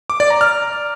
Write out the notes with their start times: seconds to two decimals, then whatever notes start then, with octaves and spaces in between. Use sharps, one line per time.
0.10 D6
0.20 D5
0.30 A#5
0.41 F6